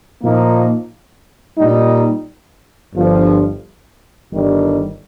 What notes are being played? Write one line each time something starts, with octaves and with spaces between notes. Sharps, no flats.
A#2 F3 A#3 D#4
A#2 G3 D#4
G1 G2 F3
G1 G2 D#3 G3